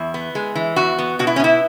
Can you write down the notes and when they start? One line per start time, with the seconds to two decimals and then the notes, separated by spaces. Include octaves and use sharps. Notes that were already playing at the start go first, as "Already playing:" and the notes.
Already playing: E2 E4
0.14 B3
0.35 G#3
0.55 E3
0.76 E2 F#4
0.99 B3
1.19 B2 F#4
1.27 E4
1.36 C#4
1.40 B3 E4